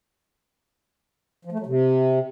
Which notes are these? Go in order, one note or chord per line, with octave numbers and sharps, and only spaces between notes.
F3
A3
F#3
C3